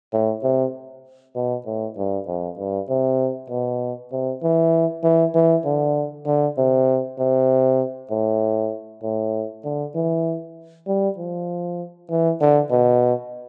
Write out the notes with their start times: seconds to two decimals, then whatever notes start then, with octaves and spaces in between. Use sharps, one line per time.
0.13 A2
0.43 C3
1.36 B2
1.66 A2
1.97 G2
2.27 F2
2.58 G2
2.89 C3
3.50 B2
4.12 C3
4.43 E3
5.03 E3
5.35 E3
5.65 D3
6.26 D3
6.58 C3
7.18 C3
8.10 A2
9.02 A2
9.64 D3
9.95 E3
10.87 G3
11.18 F3
12.10 E3
12.41 D3
12.71 B2